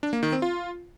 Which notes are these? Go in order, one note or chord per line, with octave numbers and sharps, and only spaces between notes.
D4
A#3
D#3
C4
F4